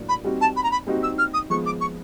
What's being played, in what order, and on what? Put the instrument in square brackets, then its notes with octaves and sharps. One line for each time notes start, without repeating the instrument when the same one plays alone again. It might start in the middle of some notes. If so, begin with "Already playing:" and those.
Already playing: [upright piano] A2 F#3 A#3 D4
[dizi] B5
[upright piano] G3 C4 D#4 F#4
[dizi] A5
B5
A#5
B5
[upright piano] G3 C4 D#4 F#4
[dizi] E6
F6
D#6
[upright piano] F3 G#3 B3 [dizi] C#6
[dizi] D6
C#6